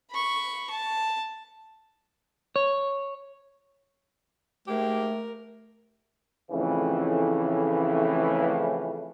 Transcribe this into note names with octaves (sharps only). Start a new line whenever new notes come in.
B5 C#6
A5
C#5
G#2 A3 A#3 G4 A#4
F2 A2 C#3 E3